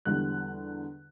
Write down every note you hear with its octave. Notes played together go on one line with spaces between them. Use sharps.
E2 D3 G3 F#6